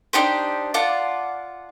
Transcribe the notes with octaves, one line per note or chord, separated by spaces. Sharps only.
D4 D#4 G4 C5
F4 D5 F#5 A5